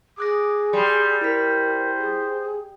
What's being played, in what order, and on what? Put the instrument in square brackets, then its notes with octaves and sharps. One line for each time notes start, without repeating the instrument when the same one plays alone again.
[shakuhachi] G#4 [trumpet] D6 [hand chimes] D#6 F#6 A#6
[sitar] G3 [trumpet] C6
[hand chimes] E4 B6 [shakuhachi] A#4 [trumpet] C5
[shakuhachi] G#4